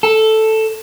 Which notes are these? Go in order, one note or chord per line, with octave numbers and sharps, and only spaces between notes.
A4